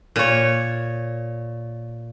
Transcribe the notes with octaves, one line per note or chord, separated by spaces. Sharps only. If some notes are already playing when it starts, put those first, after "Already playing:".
A#2 C#5